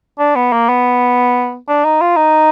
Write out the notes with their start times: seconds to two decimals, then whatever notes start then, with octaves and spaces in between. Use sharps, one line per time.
0.19 D4
0.36 B3
0.53 A#3
0.69 B3
1.68 D4
1.85 D#4
2.01 F4
2.17 D#4